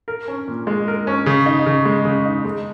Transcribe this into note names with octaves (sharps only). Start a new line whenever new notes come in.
A#4
C#4
A#2
G#3
A#4
C#4
C#3
D#4
C#3
G#3
C#3
D#4
G#3